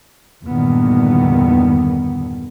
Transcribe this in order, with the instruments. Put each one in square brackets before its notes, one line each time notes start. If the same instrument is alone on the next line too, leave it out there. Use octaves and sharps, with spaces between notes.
[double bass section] E2 G2 A#2 D3 D#3 B3